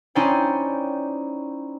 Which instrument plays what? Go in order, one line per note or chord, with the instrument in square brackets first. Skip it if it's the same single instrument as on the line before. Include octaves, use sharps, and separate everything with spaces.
[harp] C#4 D#4 E4 C5 D5 G5